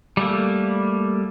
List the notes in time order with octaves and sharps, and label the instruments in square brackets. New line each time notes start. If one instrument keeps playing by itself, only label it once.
[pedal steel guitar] G3 A3 A#3